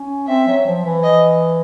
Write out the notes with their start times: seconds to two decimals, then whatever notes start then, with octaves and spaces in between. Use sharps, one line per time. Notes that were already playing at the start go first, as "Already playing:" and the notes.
Already playing: C#4
0.28 C4 E5
0.47 F#3
0.66 F3
0.85 E3
1.04 D#5